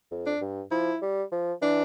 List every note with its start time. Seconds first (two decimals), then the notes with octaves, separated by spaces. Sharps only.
0.11 F2
0.27 D4
0.41 G2
0.71 F3 E4
1.02 G3
1.32 F3
1.62 E3 D4